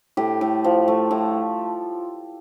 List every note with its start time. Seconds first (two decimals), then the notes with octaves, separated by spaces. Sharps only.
0.17 A2 G4
0.41 A2
0.64 F3
0.88 A3
1.11 A2